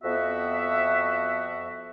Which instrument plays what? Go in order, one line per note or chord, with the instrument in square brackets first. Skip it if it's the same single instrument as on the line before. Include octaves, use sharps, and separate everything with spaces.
[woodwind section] F2 B3 F#4 E5